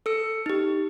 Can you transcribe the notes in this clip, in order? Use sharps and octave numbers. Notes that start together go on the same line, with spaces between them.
A4 E6 C#7
D#4 G4